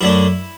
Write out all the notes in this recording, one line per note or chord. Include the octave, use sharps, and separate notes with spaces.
F#2 D3 A3 E4